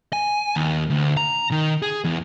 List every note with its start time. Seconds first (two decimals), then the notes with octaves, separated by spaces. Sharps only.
0.13 G#5
0.56 D#2
0.90 D2
1.17 A#5
1.51 D#3
1.82 G#4
2.04 E2